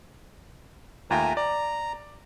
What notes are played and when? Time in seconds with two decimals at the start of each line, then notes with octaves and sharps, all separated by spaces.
1.11 D#2 A3 F4 G5 G#5 A#5
1.37 D5 A#5